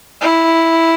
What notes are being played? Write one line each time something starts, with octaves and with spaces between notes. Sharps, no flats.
E4